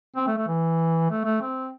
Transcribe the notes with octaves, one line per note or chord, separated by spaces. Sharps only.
C4
A3
A3
E3
A3
A3
C4